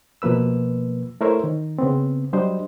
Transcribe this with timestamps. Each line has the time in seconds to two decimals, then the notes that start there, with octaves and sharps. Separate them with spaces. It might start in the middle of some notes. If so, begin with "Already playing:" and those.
0.22 B2 F3 A#3 B4 E6
1.21 A3 E4 A#4 C5 C#5 E5
1.44 D#3
1.79 C#3 B3 C4
2.33 F#3 G3 D4 C5 D#5